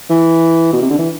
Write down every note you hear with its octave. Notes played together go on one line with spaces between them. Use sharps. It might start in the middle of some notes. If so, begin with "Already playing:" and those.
E3
B2
C3
D3
E3